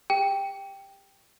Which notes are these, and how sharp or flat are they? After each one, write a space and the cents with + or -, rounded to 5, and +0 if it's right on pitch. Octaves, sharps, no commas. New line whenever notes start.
G4 +35 G5 +0